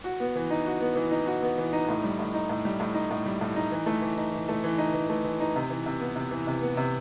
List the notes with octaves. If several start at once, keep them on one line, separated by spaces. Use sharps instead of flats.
F#4
B3
E3
D#4
F#4
B3
E3
D#4
F#4
B3
E3
D#4
A2
G3
A2
D#4
A2
G3
A2
D#4
A2
G3
A2
D#4
E3
A3
E3
D#4
E3
A3
E3
D#4
E3
A3
E3
D#4
C3
E3
C3
B3
C3
E3
C3
B3
C3